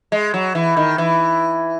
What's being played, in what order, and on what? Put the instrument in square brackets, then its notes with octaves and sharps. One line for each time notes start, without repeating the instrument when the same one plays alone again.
[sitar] G#3
F#3
E3
D#3
E3